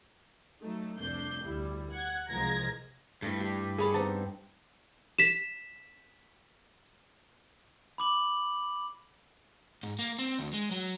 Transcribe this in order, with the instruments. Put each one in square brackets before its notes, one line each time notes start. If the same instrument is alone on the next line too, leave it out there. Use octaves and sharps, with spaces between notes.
[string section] F#3 A3 D#4
C2 F2 A3 D4 G6 C7
D2 G3 E4
F#5 G#6
C2 F3 G#3 A#4 G#6 A#6
[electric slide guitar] G2 [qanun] A3 E4
[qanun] G4
[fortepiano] G#4 B5 [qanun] A4 C#5 D5
[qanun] B3 C4 D#4 [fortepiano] A5
[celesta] B6 E7
[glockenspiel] B5 D6 F#7
[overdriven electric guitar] G#2
A#3
C4
D2
G#3
F#3